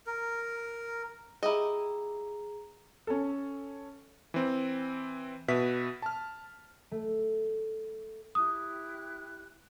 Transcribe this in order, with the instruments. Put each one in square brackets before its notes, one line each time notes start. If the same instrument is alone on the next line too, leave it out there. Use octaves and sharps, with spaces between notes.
[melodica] A#4
[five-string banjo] E4 G4 D#5 [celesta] G#4 A#5
[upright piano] C#4 A4
[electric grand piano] E3 C4
B2 B4 E5 B6
A5 F6
[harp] A3
[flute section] E4 G4 F#6 [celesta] D#6